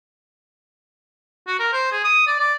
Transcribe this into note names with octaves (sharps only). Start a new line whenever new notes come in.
F#4
A#4
C5
G#4
D#6
D5
D5